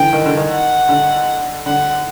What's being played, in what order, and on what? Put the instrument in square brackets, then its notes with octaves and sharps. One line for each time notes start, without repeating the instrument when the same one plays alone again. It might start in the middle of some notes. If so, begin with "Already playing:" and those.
Already playing: [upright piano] D3 E3 [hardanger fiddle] G5
[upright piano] D#3
D3
D#3
[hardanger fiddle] F#5
[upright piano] D3
[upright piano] D3 [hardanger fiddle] F#5